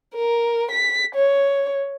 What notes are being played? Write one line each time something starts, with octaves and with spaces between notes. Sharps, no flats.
A#4
B6
C#5